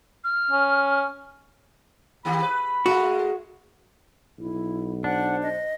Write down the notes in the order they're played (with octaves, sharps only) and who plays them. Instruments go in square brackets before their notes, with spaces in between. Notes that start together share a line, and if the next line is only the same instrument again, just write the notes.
[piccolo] F6
[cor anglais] C#4
[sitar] D#3 A#3 G4 [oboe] B5
[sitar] B4
[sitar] G#3 A3 [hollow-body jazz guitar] F#4
[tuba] B1 [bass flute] E4
[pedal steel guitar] D4 [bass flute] C5 [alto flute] F#5
[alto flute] D#5